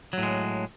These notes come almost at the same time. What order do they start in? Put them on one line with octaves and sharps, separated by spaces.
F#3 A2 G#3